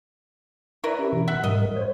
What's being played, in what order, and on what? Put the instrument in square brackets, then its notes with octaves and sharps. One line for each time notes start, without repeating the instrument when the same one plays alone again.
[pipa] E4 A#4 B4 [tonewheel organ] D5 E5 C#6
[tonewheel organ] C#4 G4
B2 E3
[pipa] E5 F#5
[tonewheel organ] G#2 G3 A#4 [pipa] D#5
[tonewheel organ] C5 C#5